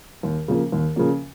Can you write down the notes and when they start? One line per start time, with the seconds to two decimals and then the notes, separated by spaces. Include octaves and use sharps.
0.23 D#2
0.48 C#3 F3 A#3
0.72 D#2
0.96 C#3 F3 A#3